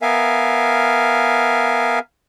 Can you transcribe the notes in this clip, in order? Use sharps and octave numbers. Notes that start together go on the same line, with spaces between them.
B3 A#4 E5 F5 G#5